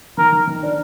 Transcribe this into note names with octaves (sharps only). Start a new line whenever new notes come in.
D#3 A#4
D#3
D#3
D4